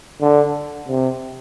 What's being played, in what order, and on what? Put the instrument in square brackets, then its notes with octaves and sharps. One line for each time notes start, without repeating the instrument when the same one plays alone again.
[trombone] D3
C3